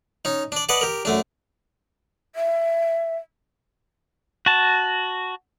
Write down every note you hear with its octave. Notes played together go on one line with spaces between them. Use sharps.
C#4 D#4
D4 D5
B4 D5 D#5 F#5 A5
G4 A#4
F#2 A3 D4
E5
F#4 A5